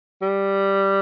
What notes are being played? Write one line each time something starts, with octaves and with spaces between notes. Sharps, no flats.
G3